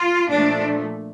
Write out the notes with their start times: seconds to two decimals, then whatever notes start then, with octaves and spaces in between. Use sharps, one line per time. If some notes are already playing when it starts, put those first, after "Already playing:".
Already playing: F4
0.30 A#2 F3 A3 D4